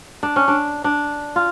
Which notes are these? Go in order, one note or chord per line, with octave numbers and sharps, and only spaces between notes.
D4
C#4
D4
D4
F4